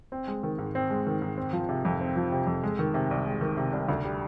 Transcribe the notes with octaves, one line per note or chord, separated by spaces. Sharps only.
C4
G#3
D#3
G#2
C4
G#3
D#3
G#2
C4
F3
C3
F2
C4
F3
C3
F2
G#3
D#3
C3
C2
G#3
D#3
C3
C2
D2
G3